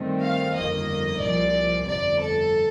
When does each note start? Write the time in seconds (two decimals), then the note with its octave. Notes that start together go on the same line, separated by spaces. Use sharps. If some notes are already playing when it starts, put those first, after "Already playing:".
Already playing: G2 D#3 A3 C4
0.22 F5
0.54 G1 F2 D#3 A#3 D#5
1.20 C2 A#2 F3 D5
1.86 G1 F2 C3 D5
2.19 A4